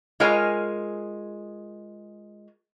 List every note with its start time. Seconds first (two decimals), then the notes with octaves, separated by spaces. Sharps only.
0.20 G#3 F4 A#4 C#5 F5 G#5